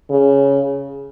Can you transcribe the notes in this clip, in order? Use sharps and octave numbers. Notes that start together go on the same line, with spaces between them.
C#3